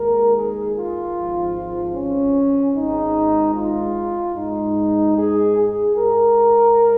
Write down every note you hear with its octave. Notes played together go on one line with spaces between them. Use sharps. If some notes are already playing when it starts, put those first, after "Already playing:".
Already playing: D#2 D#3 G#3 A#4
G#4
F4
G#1 G#2 F3
C#4
G#1 G#2 G#3 D#4
F4
G#2 G#3 D#4
G#4
G#4
G#2 G#3 A#4